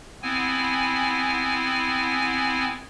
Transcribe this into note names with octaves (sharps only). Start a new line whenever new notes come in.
B3 C4 E4 G#5